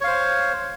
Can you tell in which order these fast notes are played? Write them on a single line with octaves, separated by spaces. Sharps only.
C#5 F5 C5